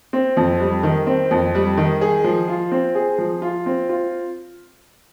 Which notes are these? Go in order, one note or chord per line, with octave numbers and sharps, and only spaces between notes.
C4
F2
G3
D#3
C4
F2
G3
D#3
G#4
F3
F4
C4
G#4
F3
F4
C4
F4